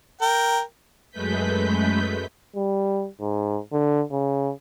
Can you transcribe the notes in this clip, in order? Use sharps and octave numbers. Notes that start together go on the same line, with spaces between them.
A#4 G5
F#2 G#3 A3 B4 G6 B6
G3
G#2
D3
C#3